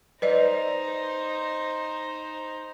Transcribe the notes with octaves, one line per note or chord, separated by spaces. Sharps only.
D#4 B4 C5 D5 D#5